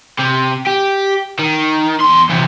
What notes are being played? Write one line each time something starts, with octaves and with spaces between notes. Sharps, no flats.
C3
G4
D#3
E2 C6
E2 C3